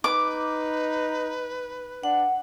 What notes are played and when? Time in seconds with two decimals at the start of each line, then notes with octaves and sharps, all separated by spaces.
0.04 D#4 B4 D6
2.03 D4 F#5